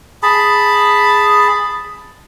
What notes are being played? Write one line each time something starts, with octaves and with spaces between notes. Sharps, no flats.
G#4 A5 B5